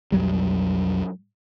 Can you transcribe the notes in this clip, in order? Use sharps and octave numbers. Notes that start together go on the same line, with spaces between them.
B1 F2 F#3 G3